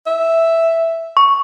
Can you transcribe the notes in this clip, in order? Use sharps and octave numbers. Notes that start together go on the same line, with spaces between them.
E5
C#6